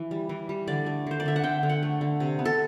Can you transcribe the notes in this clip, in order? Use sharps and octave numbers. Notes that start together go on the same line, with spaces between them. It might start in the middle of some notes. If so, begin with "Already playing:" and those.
Already playing: E3
G3
E3
G3
D3 D5
A3
D3 C5
D5
D3 E5
F#5
D3 G5
D3
F#5
A3
D3
C3
B3
A4